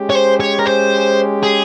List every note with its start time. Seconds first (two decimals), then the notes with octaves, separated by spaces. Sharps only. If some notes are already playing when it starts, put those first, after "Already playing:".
Already playing: G#3 C#4 G4
0.10 C#5
0.15 C5
0.41 C#5
0.59 A#4
0.66 C5
1.43 G#4